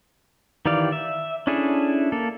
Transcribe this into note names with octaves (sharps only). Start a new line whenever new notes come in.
D#3 E3 G4 D5 F5
E5
C#4 D4 E4 G#4 A4
A#3 A4